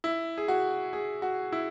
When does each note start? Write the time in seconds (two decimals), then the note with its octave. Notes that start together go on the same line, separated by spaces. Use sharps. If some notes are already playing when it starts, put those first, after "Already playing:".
0.04 E4
0.38 G#4
0.48 F#4
0.93 G#4
1.22 F#4
1.52 E4